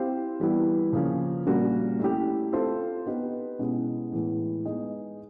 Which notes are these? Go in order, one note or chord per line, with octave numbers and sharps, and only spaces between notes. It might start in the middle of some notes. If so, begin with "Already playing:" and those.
Already playing: C4 E4 G4 C5 F5
E3 G3 B3 E4 G4
C#3 F3 A#3 C#4
A#2 G3 A#3 C#4 F#4
A3 C#4 E4 G4
C4 F4 A4 C5
B3 D#4 G4 B4
B2 G#3 C#4 E4
A2 E3 G#3 B3
G#3 B3 D#4 G#4